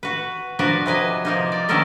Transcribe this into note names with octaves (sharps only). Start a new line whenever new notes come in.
F#4 B4
F3 D4 F#4 A#4 B4
C3 B4 D#5 G#5
F3 A#3 D#4
D5
D#3 B3 C#4 A4 A#4 D#5